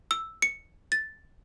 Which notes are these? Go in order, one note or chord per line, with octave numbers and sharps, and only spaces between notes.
E6
C#7
A6